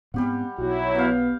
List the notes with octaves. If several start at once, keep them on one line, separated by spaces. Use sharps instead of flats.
G#2 G3 B3 C4 G4 F#5
B1 F#3 E4 F#4
B3 F5 G5